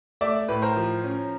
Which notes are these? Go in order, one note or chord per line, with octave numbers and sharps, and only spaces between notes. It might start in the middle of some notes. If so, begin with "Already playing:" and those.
A3 D5 E5
A2 B4
A#4 C5
F3
C#4